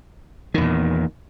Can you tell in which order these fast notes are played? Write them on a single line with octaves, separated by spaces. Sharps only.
D#3 E2 A#2